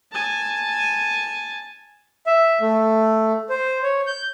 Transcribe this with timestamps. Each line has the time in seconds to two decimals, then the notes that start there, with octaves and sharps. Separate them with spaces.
0.12 G#5 A5
2.27 E5
2.61 A3
3.49 C5
3.83 C#5
4.07 G6